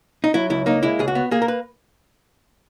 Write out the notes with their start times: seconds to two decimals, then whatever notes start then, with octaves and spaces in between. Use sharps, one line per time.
0.24 D#4
0.34 F#3 E4
0.50 C#2 E4
0.66 A#3 D#4
0.83 G#3 E4
0.99 C#2 G#4
1.08 F#4
1.15 B3
1.31 A#3 G#4
1.42 A#4
1.48 B4